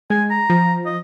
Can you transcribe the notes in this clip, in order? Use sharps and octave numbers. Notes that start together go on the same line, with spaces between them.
G#3 G#5
A#5
F3
D#5